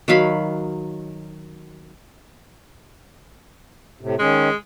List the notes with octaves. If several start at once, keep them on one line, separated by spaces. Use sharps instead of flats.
D#3 F#3 F5 B5
A2 C3
D#3 G#3 C#4